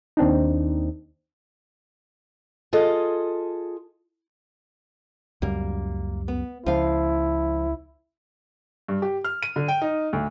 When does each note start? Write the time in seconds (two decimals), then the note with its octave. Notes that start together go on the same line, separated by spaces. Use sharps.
0.17 D#2 C4 D4 D#4
2.73 F4 G#4 A4 D#5
5.42 C#2 F#2 G3 A#3
6.28 B3
6.66 C#2 F3 E4 F5
8.88 G2
9.02 G4
9.24 F6
9.43 D#7
9.56 D3
9.68 G5
9.82 D#4
10.13 D2